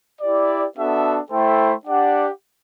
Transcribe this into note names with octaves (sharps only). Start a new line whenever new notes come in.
E4 G4 D5
B3 D4 F#4 A4 E5
A3 E4 A4 C5 G5
D4 G4 D5 F#5